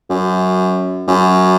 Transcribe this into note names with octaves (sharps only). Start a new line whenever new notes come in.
F#2
F#2